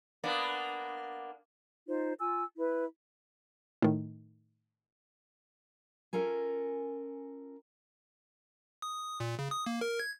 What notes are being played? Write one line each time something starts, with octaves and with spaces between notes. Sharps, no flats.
A#3 B3 D4
D#4 F4 C5
F4 G#5 E6
E4 B4
A2 D#3
C#4 F4 A4 A#4 G#5
D#6
A#2
C#3
D#6
A#3
A#4
G#6